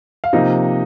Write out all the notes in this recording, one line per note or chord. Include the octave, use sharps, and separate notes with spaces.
F5
C3 F3 A#3 D#4 D#5